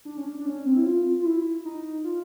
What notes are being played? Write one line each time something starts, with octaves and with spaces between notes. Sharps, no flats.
D4
C#4
D4
D4
C#4
C4
E4
F4
F4
E4
D#4
F4